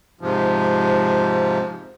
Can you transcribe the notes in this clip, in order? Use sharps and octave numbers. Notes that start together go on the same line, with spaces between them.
G#2 C3 F3